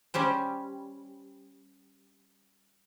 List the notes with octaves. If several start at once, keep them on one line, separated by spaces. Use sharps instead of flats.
G3 C#4 G4 C5